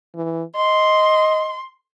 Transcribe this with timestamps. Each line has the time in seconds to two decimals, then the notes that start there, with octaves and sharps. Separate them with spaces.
0.15 E3
0.56 D#5 C6